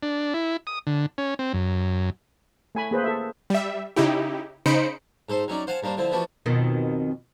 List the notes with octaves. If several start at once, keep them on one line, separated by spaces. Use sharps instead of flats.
D4
E4
D#6
D3
C#4
C4
F#2
A3 G#5 B5
A#3 G#4 B4 C5
A4 E5
G3 E5
C#3 D#4 E4 G4
C#3 D#4 C5 B5 C#7 D7
G#2 A4 C5 C6
F#3 C#4 D#4 D5
C5 F5 F#5 G#5 A5
G2 A#3 D4 C5
D3 F3 C4 E4
E3 F3 A3 B3 D4 F#4
F2 B2 D#3